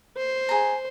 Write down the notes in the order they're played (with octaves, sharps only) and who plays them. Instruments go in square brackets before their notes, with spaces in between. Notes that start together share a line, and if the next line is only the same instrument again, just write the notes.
[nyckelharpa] C5
[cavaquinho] G#4 A#5